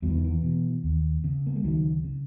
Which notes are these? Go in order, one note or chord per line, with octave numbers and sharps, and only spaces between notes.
E2 F#3
E3
D#3
E3
B2
D#2
C#3
A#3
G#3
C#2 D#3 F#3
C#3